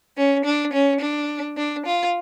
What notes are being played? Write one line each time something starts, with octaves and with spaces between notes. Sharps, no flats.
C#4
D4
C#4
D4
D4
F4